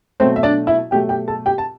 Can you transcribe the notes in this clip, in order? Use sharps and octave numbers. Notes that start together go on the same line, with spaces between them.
B2 F#3 A3 C4 C5
E5
D4 D5
E4 E5
B2 F#3 A3 G4 G5
G4 G5
A4 A5
G4 G5
A5